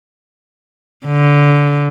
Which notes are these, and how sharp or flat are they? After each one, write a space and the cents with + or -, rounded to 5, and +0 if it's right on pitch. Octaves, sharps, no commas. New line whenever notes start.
D3 -20